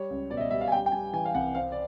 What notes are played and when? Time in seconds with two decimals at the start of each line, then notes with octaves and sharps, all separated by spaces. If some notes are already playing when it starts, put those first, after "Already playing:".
Already playing: G3 C#5
0.10 C#2
0.30 B2 D5
0.37 E5
0.40 D#5
0.51 G3 E5
0.61 F5
0.68 G#5
0.72 G3 G5
0.86 G5
0.92 G3 G#5
1.13 E3 G#5
1.25 F5
1.35 C2 F#5
1.55 C4 F5
1.72 D5